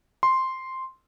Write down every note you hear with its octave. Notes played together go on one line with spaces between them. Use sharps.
C6